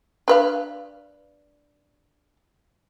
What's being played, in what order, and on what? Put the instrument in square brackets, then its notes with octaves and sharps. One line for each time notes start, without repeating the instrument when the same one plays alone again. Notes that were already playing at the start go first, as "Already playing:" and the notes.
[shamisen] D4 B4 F5